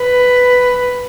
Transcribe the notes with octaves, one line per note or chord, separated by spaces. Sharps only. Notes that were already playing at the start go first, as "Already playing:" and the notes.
Already playing: B4